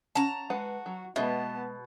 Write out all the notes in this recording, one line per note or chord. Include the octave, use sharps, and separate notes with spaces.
C#4 F#5 A5 A#5
G#3 F#4 B4 F#5
F#3
B2 G#3 B3 D#5 E5 A5